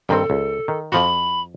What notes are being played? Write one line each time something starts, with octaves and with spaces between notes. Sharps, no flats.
G2 D#3 C4 A4
C#2
D#3
F2 F3 F#4 B5